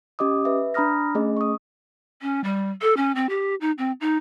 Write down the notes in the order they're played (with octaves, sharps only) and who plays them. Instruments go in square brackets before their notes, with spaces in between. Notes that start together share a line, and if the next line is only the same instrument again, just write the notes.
[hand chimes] C#4 G4 D#5 D6 D#6
B4 E5
D4 A#5 B5 D#6 F6 A#6
A3 C#4 G#4 D#5
C#6 D#6
[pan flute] C#4
G3
A4
C#4
C4
G4
D#4
C4
D#4